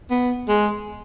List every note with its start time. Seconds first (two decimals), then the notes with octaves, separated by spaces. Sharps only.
0.11 B3
0.48 G#3